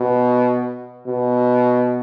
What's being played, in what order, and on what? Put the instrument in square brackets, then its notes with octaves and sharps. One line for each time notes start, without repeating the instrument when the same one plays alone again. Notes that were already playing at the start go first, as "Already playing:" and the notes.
Already playing: [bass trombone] B2
B2